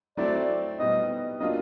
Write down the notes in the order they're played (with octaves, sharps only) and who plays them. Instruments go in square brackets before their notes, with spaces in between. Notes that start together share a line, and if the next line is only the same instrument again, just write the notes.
[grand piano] F#3 A3 C4 E4 [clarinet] D5
[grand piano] B2 G3 B3 D#4 [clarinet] D#5
[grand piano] F#3 A#3 D4 F4 [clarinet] D#5